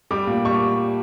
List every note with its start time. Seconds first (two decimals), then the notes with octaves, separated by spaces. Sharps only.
0.11 G3 D6
0.27 A#2
0.45 G3 C#6